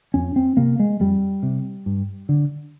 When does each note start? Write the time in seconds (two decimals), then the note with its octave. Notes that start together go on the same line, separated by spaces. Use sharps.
0.14 F2 C#4
0.36 C4
0.57 C3 A#3
0.80 G#3
1.00 F2 G3
1.43 C3
1.86 G2
2.29 D3